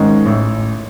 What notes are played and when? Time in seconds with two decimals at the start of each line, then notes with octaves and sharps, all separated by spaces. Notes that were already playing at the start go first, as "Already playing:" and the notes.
Already playing: G#2 D#3 G#3 C#4
0.26 A1